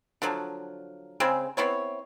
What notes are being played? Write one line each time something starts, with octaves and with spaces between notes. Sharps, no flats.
D3 F3 F#3
C#3 G#3 C4
B3 C4 E4 C#5